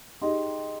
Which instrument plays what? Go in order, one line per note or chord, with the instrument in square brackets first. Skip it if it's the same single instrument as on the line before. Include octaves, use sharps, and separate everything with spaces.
[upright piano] D#4 G4 [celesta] G#4 D#5 G5 C6